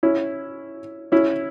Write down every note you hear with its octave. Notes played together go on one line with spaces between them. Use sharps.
C#4 E4
C#4 E4